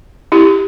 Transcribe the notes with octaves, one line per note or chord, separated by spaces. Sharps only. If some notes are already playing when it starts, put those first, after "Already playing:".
E4 G4